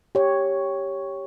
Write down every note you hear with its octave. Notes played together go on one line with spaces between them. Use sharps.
G4 C#5